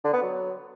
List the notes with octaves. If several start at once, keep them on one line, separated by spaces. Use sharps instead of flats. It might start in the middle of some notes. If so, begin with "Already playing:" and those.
D3
B3
F#3